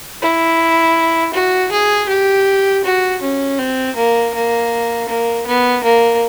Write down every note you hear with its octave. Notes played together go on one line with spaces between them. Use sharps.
E4
F#4
G#4
G4
F#4
C#4
C4
A#3
A#3
A#3
B3
A#3